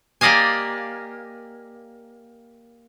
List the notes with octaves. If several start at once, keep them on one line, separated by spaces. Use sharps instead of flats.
A#3 G4 D5 D#5 F5 G#5